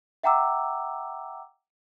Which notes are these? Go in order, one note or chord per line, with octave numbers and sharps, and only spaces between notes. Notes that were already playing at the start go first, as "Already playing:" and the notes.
E5 F#5 G5 A#5 D6 E6